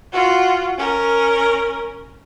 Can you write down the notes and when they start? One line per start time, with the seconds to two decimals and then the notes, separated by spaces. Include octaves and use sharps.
0.13 F4 F#4
0.78 C#4 A#4